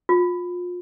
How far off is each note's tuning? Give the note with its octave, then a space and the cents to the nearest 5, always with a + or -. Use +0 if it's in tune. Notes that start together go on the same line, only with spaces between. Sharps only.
F4 +30